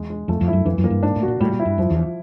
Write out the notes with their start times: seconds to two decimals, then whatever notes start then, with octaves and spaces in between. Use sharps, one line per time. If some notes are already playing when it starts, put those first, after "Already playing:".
Already playing: E2 G#3
0.10 G#3
0.28 F2 A3
0.41 F2
0.48 E4
0.53 F#2
0.65 F2 E3
0.78 F#2
0.84 A#3
0.90 G2
1.03 G#2 D4
1.16 A2
1.22 F#4
1.28 A#2
1.40 A2 G3
1.53 A#2
1.59 E4
1.65 G2
1.78 F#2 F3
1.90 E2
1.97 F3